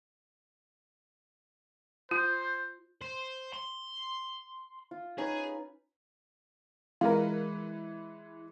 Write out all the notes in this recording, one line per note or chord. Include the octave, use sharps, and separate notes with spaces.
F4 C5
C5
C6
F4
C#4 D#4 G#4 B4
E3 G#3 F4 A#4 B4